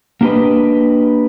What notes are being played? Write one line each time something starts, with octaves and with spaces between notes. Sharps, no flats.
A#3 D4 G4 G#4 B4 D#5